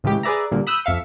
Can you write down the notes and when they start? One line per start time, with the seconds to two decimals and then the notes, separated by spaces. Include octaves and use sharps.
0.04 A2 C#3 E3 G#3 G4
0.23 G#4 B4 D5 E5 A#5
0.51 A#2 D3 G3 A#3
0.67 B5 D#6 E6 F#6 G6
0.84 F2 E5 F5 C#7